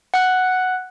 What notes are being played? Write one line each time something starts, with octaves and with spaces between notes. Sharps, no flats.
F#5 F#6